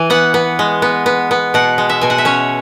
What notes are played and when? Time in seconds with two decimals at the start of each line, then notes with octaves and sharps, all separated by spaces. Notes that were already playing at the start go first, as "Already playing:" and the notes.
Already playing: E3 G#5
0.10 B3 F#5
0.34 B3
0.59 G#3
0.82 B3
1.06 B3
1.31 B3
1.54 B2 F#5
1.78 G#3
1.89 E5
2.01 B2 G#5
2.10 F#5
2.18 E5
2.25 C#4 C#5